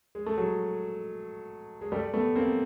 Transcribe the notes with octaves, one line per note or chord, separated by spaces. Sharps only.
G#3
A3
F#3 G#3
G#3
G3 A3
A3 B3
A#3 C4